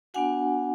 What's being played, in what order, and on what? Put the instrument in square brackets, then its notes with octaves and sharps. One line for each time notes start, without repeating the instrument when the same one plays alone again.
[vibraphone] B3 D4 F#4 F#5 G#5